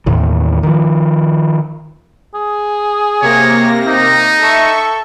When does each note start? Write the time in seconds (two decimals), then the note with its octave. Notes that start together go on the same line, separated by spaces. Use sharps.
0.06 D#2 A2 D#3 E3
0.63 D#3 F3
2.35 G#4
3.22 C3 A#3 C#5 A#6
3.87 D#4
4.41 A4 E5 C#6